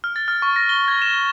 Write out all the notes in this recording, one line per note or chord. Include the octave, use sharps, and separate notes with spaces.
F6
A6
F6
C#6
A#6
G7
G#6
E7